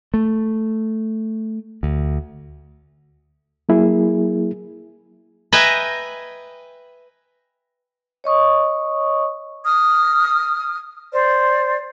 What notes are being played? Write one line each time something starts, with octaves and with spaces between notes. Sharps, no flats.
A3
D2
F#3 A#3 E4 G#4
B4 D#5 E5 G5 G#5 A#5
C#5 D#5 C#6 D#6
D#6 F6
C5 D5